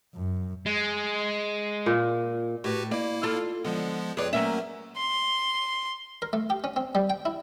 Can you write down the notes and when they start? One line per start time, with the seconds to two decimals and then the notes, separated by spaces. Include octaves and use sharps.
0.14 F#2
0.66 G#3
1.86 A#2
2.64 A2 F#4 G4 B4
2.91 A#3 E4 D5
3.23 F4 A4
3.64 D3 F3 G#3 B3
4.17 F2 G#4 B4 C#5 D5
4.33 F#3 A3 A#3 C#4 E5
4.97 C6
6.22 A#4
6.33 A3
6.50 G4
6.64 C#4
6.76 C4
6.95 G3
7.10 G5
7.25 E4